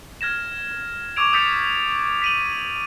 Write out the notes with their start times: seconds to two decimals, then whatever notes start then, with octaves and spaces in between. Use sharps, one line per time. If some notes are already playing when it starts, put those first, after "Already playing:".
0.21 F6 G#6 A#6 E7
1.16 C#6 D6 E6 G#6 D7 F7
1.33 D#6 G6 A6 B6 C#7
2.22 B6 D#7 F#7